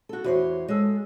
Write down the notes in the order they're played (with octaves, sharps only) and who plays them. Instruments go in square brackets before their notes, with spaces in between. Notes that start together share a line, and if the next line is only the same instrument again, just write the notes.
[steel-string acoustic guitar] F#4 A4
[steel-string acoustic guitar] E2 C5 C#5 [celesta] F#4
[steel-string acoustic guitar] G#3 A4 [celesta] C#5 E6